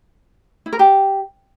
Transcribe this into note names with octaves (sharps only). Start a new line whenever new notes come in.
E4
A#4
G4